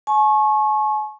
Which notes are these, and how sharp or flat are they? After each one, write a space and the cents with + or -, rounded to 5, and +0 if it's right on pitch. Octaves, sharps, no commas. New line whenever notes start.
G#5 +45 C#6 -25